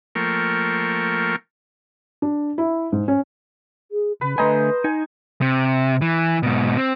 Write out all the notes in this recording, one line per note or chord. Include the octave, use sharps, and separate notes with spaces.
F3 A3 A#3 A#4 G5 C#6
D4
E4
G#2
C#4
G#4
C#3 B4
D3 A3 B4 C5 D#5 G#5 A#5
D#4 G#5
C3
E3
G#2 B2
C4